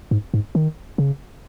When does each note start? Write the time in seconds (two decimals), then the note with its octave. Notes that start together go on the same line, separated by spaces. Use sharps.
0.11 G#2
0.34 G#2
0.55 D#3
0.98 C#3